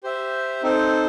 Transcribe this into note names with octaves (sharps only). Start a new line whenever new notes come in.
G4 C5 E5
C4 D#4 A4 C5